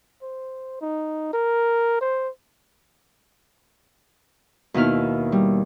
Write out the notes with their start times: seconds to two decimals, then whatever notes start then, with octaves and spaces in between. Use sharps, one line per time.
0.22 C5
0.81 D#4
1.33 A#4
2.01 C5
4.74 D#2 B2 D#4 E4 F6
5.32 G3